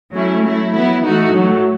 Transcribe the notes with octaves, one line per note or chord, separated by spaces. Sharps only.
F#3 A3 C#4 E4
F#3 A3 E4
F#3 B3 E4
E3 A3 D#4 F#4
A2 F#3 A3